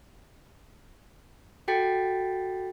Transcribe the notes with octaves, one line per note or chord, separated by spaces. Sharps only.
F#4 A4 G5 A6 B6 C#7